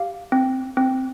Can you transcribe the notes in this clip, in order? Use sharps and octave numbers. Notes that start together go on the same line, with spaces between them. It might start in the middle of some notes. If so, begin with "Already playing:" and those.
Already playing: G4 F5
C4
C4